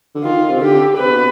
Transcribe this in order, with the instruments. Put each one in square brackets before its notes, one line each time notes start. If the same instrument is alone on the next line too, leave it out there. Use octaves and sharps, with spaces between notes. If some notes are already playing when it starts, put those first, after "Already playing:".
[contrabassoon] D3
[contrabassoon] D#3 [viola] F4
[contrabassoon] C3
[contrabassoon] D3 [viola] G4
[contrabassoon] C3 [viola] B4
[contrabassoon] B2